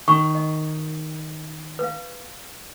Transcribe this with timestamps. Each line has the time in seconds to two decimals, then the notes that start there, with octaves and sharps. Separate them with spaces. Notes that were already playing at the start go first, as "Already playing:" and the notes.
0.08 D#3 C#6
0.35 D#5
1.79 B4 F5